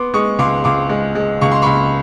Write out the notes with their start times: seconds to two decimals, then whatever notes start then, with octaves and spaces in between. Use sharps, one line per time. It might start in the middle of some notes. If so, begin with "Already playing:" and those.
Already playing: B3 C6 D6
0.14 G#3 C#6 D#6
0.38 C#2 C6 D6
0.64 C#2 C6 D6
0.89 G#3
1.15 G#3
1.41 C#2 C#6
1.52 C6
1.62 C#2 B5 C#6